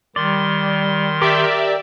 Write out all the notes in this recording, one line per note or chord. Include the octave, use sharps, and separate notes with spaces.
D#3 G3 D5 C6
G4 A#4 D5 E5 D6